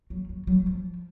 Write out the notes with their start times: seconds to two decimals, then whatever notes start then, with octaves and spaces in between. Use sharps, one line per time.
0.10 F#3
0.29 F#3
0.47 F#3
0.66 F3